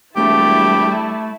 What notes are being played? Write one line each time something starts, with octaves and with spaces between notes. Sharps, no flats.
E1 G3 A3 E4 G4 A5